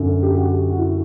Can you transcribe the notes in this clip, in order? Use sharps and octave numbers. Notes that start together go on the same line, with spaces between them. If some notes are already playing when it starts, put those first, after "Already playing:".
Already playing: F#2 D3
G4
F#4
F#4
E4